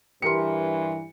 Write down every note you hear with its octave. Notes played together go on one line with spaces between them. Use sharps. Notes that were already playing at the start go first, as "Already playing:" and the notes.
G2 E3 G4 A#4 C6 C#7